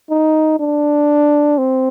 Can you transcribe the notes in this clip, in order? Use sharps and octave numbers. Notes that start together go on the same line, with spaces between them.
D#4
D4
C4